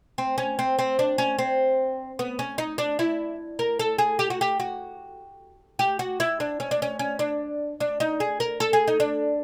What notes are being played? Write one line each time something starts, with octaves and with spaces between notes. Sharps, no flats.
C4
C#4
C4
C4
D4
C#4
C4
B3
C#4
D#4
D4
E4
A#4
A4
G#4
G4
F#4
G4
F#4
G4
F#4
E4
D4
C#4
D4
C#4
C#4
D4
D4
D#4
G#4
A#4
A4
G#4
D#4
D4